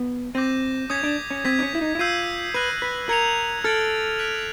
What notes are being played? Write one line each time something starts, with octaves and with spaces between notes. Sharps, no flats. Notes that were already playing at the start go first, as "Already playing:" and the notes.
Already playing: B3
C4 D6 G6 A#6 D#7
C#4 D#6 G#6 B6
D4
C#4
C4 G#6 B6 D#7
D4
C#4
E4
D#4
E4
F4 E6 G6 C7 D#7
B4 F#6 A#6 D#7 F#7
B4
A#4 G#6 C#7 F7
A4 F6 A6 D7 F#7
F#6 B6 D7 F7